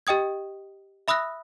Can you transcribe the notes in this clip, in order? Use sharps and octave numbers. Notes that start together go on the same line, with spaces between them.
G4 D#5 G5 D#6 G#6
E5 B5 D#6 E6 F#6 A#6